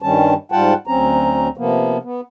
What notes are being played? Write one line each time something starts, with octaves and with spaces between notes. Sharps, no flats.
G2 D#3 G3 C#4 A5
G#2 G3 F4 F#5 G5 A5
D2 F#3 C4 C#4 A#5
C3 F3 A#3 B3
B3